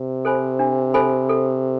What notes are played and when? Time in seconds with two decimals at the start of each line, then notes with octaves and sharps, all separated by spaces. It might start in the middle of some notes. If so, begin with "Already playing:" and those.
Already playing: C3
0.25 A4 C5 G#5 B5
0.59 D4
0.94 A4 C5 G#5 B5
1.29 A4